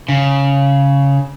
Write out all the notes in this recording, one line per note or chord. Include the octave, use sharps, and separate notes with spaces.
C#3